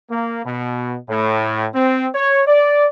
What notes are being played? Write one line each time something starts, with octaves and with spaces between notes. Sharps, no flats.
A#3
B2
A2
C4
C#5
D5